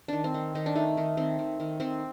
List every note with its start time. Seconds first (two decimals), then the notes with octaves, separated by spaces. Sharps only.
0.08 D#3 D4
0.24 C4
0.34 D#3
0.55 D#3 D#4
0.66 D4
0.75 A3 D#4
0.97 D#3
1.17 D#3 C4
1.39 D#3
1.60 D#3
1.80 D#3 C4